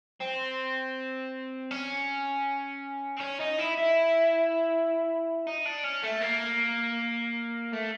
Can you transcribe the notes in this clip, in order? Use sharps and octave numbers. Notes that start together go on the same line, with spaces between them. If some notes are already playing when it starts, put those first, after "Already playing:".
C4
C#4
C4
C#4
D#4
E4
E4
D#4
D4
C#4
A3
A#3
A3